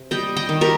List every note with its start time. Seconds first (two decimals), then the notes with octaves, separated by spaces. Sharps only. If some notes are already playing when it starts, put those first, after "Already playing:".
Already playing: C3
0.11 G3 D#5 G5
0.36 D#5 G5
0.49 D#3
0.61 G4 A#4